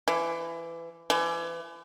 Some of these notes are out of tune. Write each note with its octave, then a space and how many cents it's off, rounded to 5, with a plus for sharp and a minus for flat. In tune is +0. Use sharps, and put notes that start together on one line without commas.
E3 +25
E3 +35